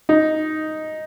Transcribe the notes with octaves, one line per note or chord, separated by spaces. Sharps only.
D#4